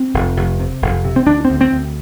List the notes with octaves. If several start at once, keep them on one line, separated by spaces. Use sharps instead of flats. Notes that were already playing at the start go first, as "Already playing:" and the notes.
Already playing: C4
F1
F1
C3
F1
C3
C4
D2 D4
C4
D2
C4
D2